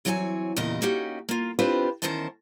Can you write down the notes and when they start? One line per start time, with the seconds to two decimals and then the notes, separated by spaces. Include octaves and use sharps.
0.05 E3 F#3 C4 C#5 D5 G#5
0.56 E2 A#2 C#3 G4 A#4 D#5
0.82 A#3 C#4 D#4 F#4 G4
1.29 A#3 F4
1.59 C4 D4 F4 G4 B4 C5
2.02 E2 D#3 C#4 A#4 C5 A5